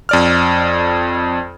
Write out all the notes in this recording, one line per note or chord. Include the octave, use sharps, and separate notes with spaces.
F2 D5 F6